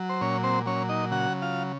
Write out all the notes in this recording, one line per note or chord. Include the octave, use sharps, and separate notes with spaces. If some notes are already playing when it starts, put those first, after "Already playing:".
Already playing: F#3
C5
A#2 C#4 C#5
C4 C5
F#3 C#4 C#5
D#4 D#5
C#3 F#4 F#5
F4 F5